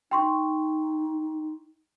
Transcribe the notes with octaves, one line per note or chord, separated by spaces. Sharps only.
D#4 G5 C6 C#6